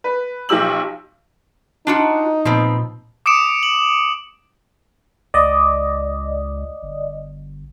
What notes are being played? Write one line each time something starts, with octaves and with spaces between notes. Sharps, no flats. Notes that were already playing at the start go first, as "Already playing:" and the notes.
B4
B1 F3 G4 E6 F#7
D4 D#4 F4 F#4
A#2 F3 B3 C4
D6 D#6 C#7 D7 E7
F#7
C#2 D5 D#5
G1